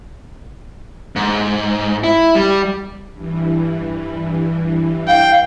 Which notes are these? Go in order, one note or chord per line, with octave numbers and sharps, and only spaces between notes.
G#2
E4
G3
G2 E3
F5 G5